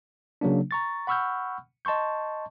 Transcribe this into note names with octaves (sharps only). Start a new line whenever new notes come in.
C#3 F#3 A#3 D4
A#5 C#6 A6
F#5 B5 C#6 E6 F6 G6
D#5 A5 C6 C#6 G6